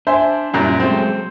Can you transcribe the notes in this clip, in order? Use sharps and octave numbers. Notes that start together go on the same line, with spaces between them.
D4 C5 E5 G#5
F#2 A#2 G3 E4
F#3 G#3 A3 C4